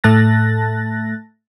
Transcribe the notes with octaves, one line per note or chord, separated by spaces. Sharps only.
A2 A3 A5 F#6 A6 A#6